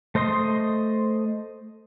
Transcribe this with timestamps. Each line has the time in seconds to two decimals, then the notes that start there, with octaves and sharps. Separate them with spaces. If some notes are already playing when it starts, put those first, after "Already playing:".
0.15 A3 C5 D#5 C6 D#6